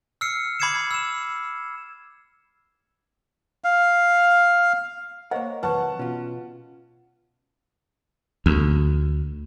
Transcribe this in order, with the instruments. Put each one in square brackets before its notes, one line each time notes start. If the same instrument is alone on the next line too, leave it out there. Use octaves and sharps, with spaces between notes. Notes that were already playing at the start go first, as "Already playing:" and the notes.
[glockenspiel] E6 F6 C7 C#7
B5 D6 G#6 C7 C#7 E7
E6 E7
[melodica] F5
[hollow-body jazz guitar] A#3 F#5 [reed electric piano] A#4 C#5 [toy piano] C5 D#5 F5
[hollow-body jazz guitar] C3 E3 F#3 [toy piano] B4 C#6 [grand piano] F#5 A5
[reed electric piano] B2 [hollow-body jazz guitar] C#4 F4
[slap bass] D2